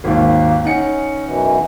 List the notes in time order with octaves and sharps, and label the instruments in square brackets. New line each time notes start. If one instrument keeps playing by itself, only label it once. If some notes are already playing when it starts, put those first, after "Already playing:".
[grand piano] G#1 D#2 [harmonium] A#3
[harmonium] C#4 [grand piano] D#4 F#5 C#7
[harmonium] F#2 B2 E3